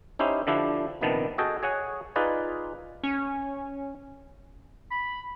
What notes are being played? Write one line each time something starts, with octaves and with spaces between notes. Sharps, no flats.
C#4 D#4 E4 G4 C5
D3 F3 D4 E4 G4
A#1 C3 D#3 G3 B3 A5
F#4 G#4 A4 D#5 G5
G#4 C#5 F#5 G#5
D#4 F4 G#4 B4 D5
C#4
B5